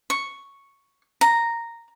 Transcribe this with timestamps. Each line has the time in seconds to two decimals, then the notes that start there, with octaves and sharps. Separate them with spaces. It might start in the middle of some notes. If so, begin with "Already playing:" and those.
0.10 C#6
1.21 A#5